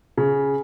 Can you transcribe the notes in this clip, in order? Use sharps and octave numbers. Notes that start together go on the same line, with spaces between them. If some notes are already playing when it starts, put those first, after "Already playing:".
C#3